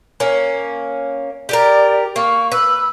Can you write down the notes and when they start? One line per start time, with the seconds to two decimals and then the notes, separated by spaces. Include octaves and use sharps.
0.20 A#3 C#4
1.49 G4 G#4 A#4 D5
2.16 A#3 C#6
2.52 B4 E6